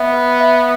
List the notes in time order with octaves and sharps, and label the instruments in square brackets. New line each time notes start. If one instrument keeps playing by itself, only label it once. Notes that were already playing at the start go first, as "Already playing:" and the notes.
Already playing: [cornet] B3 [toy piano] E5
[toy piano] B4
E5